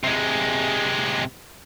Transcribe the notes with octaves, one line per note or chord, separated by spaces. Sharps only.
C3 G#3